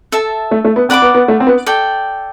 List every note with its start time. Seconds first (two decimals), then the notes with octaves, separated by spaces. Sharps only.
0.12 A4 E5 A5
0.51 A3
0.65 A3
0.76 B3
0.89 C4 D5 F#5 B5 D6
1.02 B3
1.14 B3
1.28 A3
1.40 C4
1.47 B3
1.66 A4 D5 G5